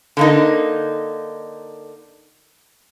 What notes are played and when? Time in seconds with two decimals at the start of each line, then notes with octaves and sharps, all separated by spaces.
0.17 D3 A#3 D#4